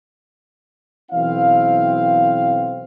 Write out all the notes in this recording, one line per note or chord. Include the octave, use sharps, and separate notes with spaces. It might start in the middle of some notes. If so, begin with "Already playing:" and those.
B1 E3 C4 E4 F5